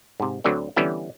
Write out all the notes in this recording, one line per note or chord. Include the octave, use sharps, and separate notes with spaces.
G#2 C3
D2 D3 F#3 C4 D5
D3 E3 G3 B3 C#4 E4